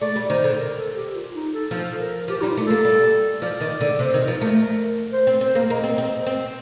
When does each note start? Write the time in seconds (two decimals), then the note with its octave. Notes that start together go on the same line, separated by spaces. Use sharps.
0.01 A3 D5
0.16 G3
0.29 D#3 C5
0.44 D3
0.58 A#4
0.77 A4
0.95 G4
1.15 F4
1.34 D#4
1.53 A4
1.71 F3 A4
2.00 A#4
2.28 F3 G4
2.42 G3 D#4
2.47 F4
2.57 A3
2.66 A#3 A4
2.85 G3
3.42 F3 D5
3.60 D#3
3.81 D3
3.99 C3 C5
4.14 D#3
4.27 F3 A#4
4.41 A3
5.13 C5
5.27 C4
5.41 C4 C5
5.55 A#3
5.70 A#3 D#5
5.84 C4
5.98 C4
6.26 C4